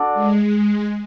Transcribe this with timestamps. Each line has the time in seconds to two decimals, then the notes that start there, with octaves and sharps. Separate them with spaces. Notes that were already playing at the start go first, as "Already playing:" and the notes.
Already playing: D4 F#4 A4 D5 F#5
0.14 G#3